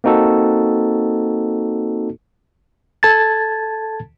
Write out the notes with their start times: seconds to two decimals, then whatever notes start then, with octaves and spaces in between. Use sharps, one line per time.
0.04 A#3 C4 D#4 F#4 A4
3.03 A4 A5 G#6 A6